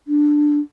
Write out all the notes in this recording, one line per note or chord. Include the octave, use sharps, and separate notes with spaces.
D4